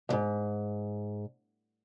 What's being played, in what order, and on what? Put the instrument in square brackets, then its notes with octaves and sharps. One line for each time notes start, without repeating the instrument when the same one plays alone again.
[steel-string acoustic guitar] D2 G#2